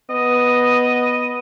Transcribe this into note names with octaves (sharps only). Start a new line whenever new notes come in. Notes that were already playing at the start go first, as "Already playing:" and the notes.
B3 D#5